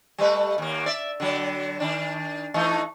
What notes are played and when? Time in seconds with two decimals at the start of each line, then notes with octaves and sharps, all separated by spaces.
0.18 G3 A3 B4
0.58 D#2 A#3
0.86 D5 E5
1.20 D3 F#3
1.80 D#3 D4
2.54 E3 A3 D#4